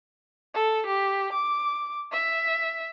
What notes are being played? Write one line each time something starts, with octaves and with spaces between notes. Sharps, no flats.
A4
G4
D6
E5